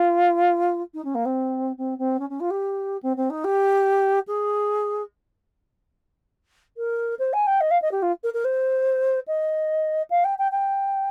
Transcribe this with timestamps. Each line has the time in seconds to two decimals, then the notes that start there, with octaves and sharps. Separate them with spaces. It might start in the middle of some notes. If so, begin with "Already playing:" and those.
Already playing: F4
0.94 D#4
1.04 C#4
1.15 A#3
1.25 C4
1.78 C4
1.98 C4
2.19 C#4
2.30 C#4
2.40 F4
2.50 G4
3.02 C4
3.17 C4
3.30 D#4
3.44 G4
4.27 G#4
6.77 A#4
7.19 C5
7.33 G#5
7.47 G5
7.61 D#5
7.71 F5
7.82 D#5
7.91 G4
8.02 F4
8.24 A#4
8.34 A#4
8.44 C5
9.27 D#5
10.10 F5
10.24 G5
10.38 G5
10.52 G5